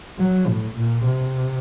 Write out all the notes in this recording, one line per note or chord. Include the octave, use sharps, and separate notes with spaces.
F#3
A2
A#2
C3